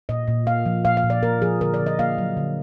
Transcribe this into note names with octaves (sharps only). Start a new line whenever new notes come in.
A#2 D#5
A#2
A#3 F5
F3
A#2 F5
F5
A#2
D5
A#3 A#4
F3 G#4
D3 A#4
D5
D3
D#5
A#3 F5
F#3
D3